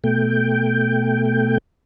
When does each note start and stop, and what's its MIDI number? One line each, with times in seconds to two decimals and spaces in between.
0.04 1.58 47
0.04 1.58 57
0.04 1.58 79